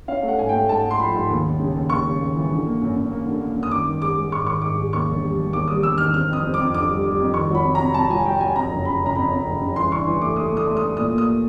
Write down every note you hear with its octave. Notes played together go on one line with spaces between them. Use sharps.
C#4 F5
A3
F#5
G#2 G#5
A3 G5
G#2 A5
A3
C6
F3 B5
G#2
D#2
D#2
C#3
D#2
D#2 C#6
C#3
D#2
E3
D3
A#3
F#2
F#2
A#3
D3
A#3
F#2
D#6
D#3 D6
D#3
G#3 D6
G#3
G#2 C#6
D#3 C#6
G#2 D6
G#3
D#2 C#6
E1
G3
E1
D#2 D6
G3 D#6
E1 E6
D#3 F6
C4 F6
F2 D#6
C4
D6
F2
D3 D6
G3
G3
F2
D#3 C#6
F#3 B5
C3
C3 A#5
C3 A5
F#3 G#5
F#3 G5
F#3 G#5
F2 A#5
F#1
C#3 B5
F#1
A#5
F2 B5
F2
F#1
C#3
E3 C6
G2 C#6
E3
A3 D6
A3 D#6
A3 D#6
A3
D#6
A3
A#2 D#6
A#3
D#6